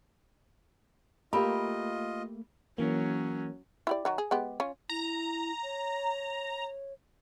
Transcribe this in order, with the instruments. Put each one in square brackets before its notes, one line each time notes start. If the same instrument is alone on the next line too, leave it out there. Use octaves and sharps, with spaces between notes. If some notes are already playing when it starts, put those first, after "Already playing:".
[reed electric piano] A3 A#3 [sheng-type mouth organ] F4 D#5 [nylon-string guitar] G4 E5 [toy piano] B5
[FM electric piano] E3 A#3 [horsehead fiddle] F#3 C#4
[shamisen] E4 G4 D5
D#3 F#3
G#4
G#3 B3 G4
C#4 F4
[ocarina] E4 [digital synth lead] A#5
[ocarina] C#5